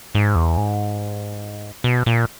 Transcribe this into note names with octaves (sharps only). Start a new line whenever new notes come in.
G#2
E2
G#2
B2
A#2